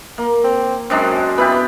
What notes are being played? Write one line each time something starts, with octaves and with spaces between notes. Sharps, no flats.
A#3
C4
F#2 G#3 C4 D4
B3 E4 G4 B4